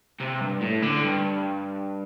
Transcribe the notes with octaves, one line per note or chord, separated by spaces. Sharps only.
C3
G2
A2
D3
G2